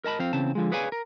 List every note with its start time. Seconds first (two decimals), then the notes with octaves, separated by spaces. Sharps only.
0.04 A#4 D#5 A5 B5
0.19 F2 C4 F5
0.33 E2 C#3 C4 A5
0.55 D3 F3 G#3
0.72 G#4 B4 C#5 D5 F5 G#5
0.92 A#4